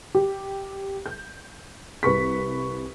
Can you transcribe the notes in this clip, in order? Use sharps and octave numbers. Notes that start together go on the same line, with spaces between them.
G4
G6
C2 B4 C#6 B6